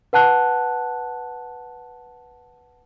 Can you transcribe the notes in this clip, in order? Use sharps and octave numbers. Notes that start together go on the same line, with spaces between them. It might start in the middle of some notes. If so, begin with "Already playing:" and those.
B4 F#5 A5 F#6